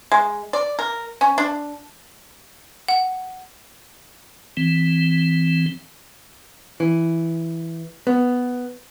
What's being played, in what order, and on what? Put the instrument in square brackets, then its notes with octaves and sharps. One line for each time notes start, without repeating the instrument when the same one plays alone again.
[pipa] G#3
D5
A#4
C#4
D4
[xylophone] F#5
[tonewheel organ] E3 C4
[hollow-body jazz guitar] E3
B3